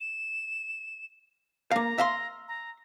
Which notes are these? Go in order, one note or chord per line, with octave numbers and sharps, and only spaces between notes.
E7
A#3 F5 A#5
E5 F5 C6
A#5